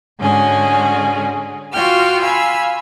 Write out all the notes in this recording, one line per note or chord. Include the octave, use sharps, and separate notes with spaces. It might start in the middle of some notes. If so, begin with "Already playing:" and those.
G#2 D3 G#3 C#4 F#4 G#4
F4 F#4 G5 D6 F6
F5 G#5 B5 E6